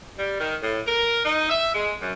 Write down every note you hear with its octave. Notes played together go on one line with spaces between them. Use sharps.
G3
D#3
A2
A#4
D#4
E5
G#3
F#2